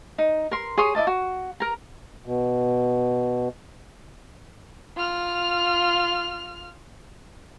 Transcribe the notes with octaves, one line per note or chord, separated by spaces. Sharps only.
D#4
A#4 C6
G#4 C#5 C6 D#6
E4 D5 D#5 A5
F#4
A#4 A#5
B2
F4 F6